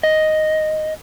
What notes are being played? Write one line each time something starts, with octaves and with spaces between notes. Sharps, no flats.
D#5